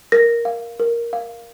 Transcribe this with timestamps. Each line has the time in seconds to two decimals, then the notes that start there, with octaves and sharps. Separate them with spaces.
0.12 A#4 A#6
0.45 F5
0.80 A#4
1.13 F5